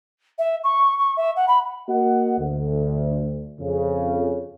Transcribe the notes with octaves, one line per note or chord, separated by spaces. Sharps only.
E5
C#6
C#6
E5
F#5
B5
A#3 F#4 A#4 D#5 F#5
D2
F2 C#3